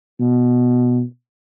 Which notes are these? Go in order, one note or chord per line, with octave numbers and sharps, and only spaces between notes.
B2